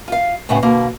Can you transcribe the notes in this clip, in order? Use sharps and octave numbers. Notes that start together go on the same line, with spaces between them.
F4 F5
D2 A2 C#3 B3 F#5
B2 D3 A#3